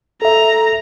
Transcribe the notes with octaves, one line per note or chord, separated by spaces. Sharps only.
A4 E5 A#5